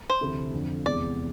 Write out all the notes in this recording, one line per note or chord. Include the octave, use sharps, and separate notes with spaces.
C5
D2 C3 E3 A3 E4
F2 D3 F3
E2 C3 G#3 B3 D5